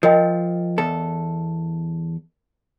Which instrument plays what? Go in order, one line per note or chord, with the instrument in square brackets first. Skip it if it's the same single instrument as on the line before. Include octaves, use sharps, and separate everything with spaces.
[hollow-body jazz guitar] F3 [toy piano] A#4 D#5 G5
[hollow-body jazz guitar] E2 A4